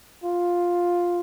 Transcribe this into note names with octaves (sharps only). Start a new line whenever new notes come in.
F4